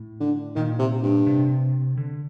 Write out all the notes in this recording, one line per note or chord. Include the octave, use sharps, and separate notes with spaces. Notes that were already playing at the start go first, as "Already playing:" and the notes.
Already playing: A2
D3
A#2 D#3
C3
G2
C3
D3